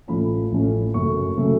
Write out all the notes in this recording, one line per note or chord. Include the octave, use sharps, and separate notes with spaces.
A1 A2 F3 A3 C#4 B5
A1 A2 F3 A3 C#4
F#2 C#3 F#3 A3 C#6
C#3 F#3 A3